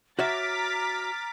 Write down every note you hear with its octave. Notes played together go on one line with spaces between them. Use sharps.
F#4 C#5 E5 A#5 D6 F6 A6 B6